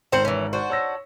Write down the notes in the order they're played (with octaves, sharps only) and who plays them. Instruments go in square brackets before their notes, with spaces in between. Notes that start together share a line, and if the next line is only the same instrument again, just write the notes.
[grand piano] G#1 C#7 F#7 [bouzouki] C4 C5
[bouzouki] E3 C#4
D4 F#4 C5
[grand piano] C#5 E6 A#6